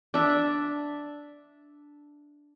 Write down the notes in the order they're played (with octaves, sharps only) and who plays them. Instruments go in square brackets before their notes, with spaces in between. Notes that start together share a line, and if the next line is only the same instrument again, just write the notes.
[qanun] D4 E5